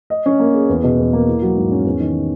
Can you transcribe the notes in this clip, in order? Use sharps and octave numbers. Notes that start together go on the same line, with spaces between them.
D#5
C#4
A#3
G#4
E2
B2
E2
A#3
E4
F#3
G#2
C#4
E2
D#3